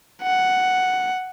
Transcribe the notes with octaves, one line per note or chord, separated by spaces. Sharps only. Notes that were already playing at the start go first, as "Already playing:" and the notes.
F#5